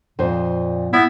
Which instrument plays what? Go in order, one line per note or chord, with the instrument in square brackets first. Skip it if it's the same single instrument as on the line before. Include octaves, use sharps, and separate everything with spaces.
[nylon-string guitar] F2 C5 [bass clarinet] A#2
[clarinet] B3 [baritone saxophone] E4 [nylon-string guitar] D5